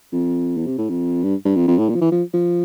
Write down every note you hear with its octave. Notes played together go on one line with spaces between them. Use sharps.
F2
E2
C3
A2
F2
G2
G2
F2
F2
A2
A#2
F3
E3
F3
F3